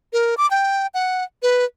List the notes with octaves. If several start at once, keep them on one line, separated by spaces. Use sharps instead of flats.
A#4
D6
G5
F#5
B4